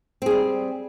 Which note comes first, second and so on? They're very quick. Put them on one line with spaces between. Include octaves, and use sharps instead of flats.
C4 G#4 G3